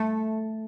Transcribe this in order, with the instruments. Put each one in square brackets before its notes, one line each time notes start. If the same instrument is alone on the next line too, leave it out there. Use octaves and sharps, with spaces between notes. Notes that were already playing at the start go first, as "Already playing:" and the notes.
Already playing: [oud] A3